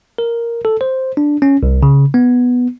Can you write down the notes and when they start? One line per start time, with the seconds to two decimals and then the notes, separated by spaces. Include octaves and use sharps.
0.18 A#4
0.65 A4
0.81 C5
1.17 D4
1.42 C#4
1.63 C2
1.83 C#3
2.14 B3